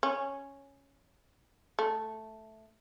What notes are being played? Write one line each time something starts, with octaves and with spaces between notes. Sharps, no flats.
C#4
A3